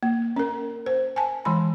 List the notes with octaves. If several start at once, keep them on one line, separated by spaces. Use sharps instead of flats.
A#3
C#4 A#4
C5
G#5 A5
E3 G#3 B5